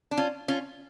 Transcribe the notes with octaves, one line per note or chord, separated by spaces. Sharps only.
D4
C#4 F4
C#4 F4